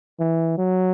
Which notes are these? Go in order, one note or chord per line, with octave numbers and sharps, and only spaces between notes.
E3
F#3